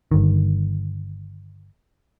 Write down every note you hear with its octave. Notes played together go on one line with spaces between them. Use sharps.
G1 D#3